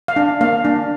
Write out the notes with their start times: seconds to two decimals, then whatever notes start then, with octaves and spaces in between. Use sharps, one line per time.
0.08 F5
0.16 D4
0.41 A#3 F5
0.65 D4